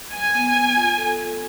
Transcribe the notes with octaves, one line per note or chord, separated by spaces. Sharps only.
F#3 G#5
B3
B3
F4
A4
F4